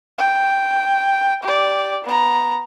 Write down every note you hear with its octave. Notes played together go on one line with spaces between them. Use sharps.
G5
G4 D5
B3 A#5